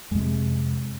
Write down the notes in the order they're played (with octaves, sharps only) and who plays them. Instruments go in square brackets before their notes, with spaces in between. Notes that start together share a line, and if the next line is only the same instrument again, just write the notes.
[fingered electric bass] F2 C3 G#3